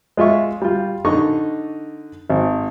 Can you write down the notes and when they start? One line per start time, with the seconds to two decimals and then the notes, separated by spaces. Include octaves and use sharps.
0.17 G#3 F4 E5 C#6
0.62 G3 F4
1.05 D3 D4 D#4 D#5 C#6
2.30 G#1